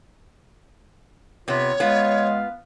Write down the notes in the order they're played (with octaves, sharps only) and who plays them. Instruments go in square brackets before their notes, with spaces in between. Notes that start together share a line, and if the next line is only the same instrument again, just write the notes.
[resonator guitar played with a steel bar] C3 B3 [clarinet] F4 [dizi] C#5
[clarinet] G#3 [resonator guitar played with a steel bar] B3 F4 [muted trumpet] F5